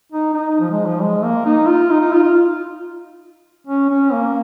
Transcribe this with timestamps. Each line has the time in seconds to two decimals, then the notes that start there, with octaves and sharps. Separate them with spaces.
0.12 D#4
0.34 D#4
0.60 F3
0.71 G#3
0.86 F3
1.02 G#3
1.24 A#3
1.46 D#4
1.67 F4
1.91 D#4
2.01 D#4
2.13 F4
2.24 F4
3.67 C#4
3.90 C#4
4.13 A#3